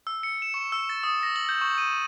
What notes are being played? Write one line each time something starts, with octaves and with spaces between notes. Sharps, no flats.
E6
C#7
E7
C#6
E6
A6
D#6
A#6
F#7
G6
C#6
D#7